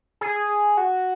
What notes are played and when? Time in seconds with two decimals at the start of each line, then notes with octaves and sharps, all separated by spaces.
0.21 G#4
0.77 F#4